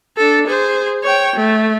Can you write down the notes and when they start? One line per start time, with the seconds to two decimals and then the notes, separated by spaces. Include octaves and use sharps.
0.17 D4 A4
0.47 G#4 C5
1.03 C#5 G5
1.36 A3